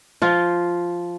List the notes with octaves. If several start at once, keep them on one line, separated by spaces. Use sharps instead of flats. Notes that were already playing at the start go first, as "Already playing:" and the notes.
F3 F4